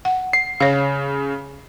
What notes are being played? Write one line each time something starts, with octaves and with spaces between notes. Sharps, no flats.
F#5
C7
C#3 C#5 F5